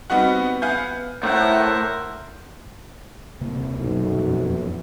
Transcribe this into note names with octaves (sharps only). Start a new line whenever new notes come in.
G3 B3 C4 D#4 F#4 F#5
B3 F5 F#5 G#5 G6
A2 A#4 C5 E5 F#5
D#1 C2 C3 A#3
B1 F#2
E1 F2 A#2